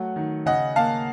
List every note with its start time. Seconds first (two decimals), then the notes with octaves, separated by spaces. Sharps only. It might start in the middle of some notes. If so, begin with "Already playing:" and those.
Already playing: F#3 A3 F#5
0.16 D#3
0.46 C#3 D#5 F#5
0.76 A#3 F5 A5